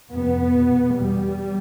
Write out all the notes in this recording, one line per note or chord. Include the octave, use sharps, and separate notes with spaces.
F2 C3 B3
E2 B2
E2 B2 G3